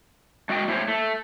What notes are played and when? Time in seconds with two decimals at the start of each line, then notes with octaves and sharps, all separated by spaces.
0.49 G#3 F#4 D#5 G5
0.68 A3 E4 C5 C#5
0.88 A3